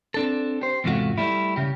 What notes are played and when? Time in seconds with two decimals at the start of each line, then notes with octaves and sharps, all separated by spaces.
0.14 C4 D4 A4
0.61 G4 C5
0.84 E2 G#2 C3 A3 F4 F#4
1.18 G3 A3 E4
1.56 C#3 G4